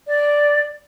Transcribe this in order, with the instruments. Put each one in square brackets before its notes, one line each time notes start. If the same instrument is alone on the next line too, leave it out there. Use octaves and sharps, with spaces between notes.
[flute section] D5